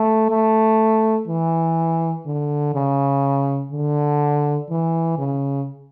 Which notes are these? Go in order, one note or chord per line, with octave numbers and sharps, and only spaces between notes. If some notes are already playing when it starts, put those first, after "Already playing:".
Already playing: A3
A3
E3
D3
C#3
D3
E3
C#3